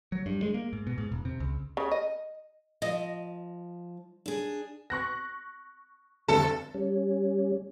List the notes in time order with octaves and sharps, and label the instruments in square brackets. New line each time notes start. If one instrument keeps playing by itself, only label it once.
[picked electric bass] F#3
G2
G#3
A#3
G#2
B2
G#2
E1
C3
C#2
[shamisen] C#3
D#5
[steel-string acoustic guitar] F3 [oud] D#5
[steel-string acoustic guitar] D4 G#4
[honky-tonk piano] C#6 F#6 A#6
[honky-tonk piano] F1 D2 G2 [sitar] A4
[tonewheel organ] G3 C#4